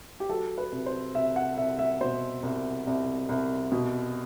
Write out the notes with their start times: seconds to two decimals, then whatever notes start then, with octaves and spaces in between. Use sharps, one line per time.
0.20 G4
0.29 F#3 A4
0.58 B4
0.72 C2
0.86 C5
1.15 C2 E5
1.36 F#5
1.58 C2 E5
1.79 E5
2.01 B2 C5
2.43 C2
2.87 C2
3.29 C2
3.72 B2